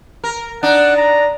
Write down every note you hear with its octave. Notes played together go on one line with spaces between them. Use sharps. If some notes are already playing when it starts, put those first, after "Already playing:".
A#4
D4 D#4 F#5
A#5